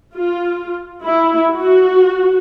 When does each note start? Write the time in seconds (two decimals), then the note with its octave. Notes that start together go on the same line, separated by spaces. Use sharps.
0.14 F4
1.04 E4
1.53 F#4